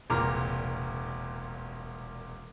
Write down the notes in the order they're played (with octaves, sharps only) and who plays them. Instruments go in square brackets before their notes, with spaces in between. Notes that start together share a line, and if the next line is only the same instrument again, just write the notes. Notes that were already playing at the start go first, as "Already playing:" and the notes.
[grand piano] E1 C2 A#2 A#5 D6 F6